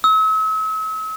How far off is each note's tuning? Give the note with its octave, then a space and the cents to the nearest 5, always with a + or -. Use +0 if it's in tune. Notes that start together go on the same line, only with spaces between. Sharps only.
E6 -40